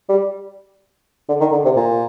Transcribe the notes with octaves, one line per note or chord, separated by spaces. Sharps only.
G3
D3
D#3
D3
C3
A#2